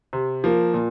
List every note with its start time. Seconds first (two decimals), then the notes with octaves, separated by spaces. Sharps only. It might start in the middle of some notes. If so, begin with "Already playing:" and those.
0.13 C3
0.44 F3 A#3
0.74 A#2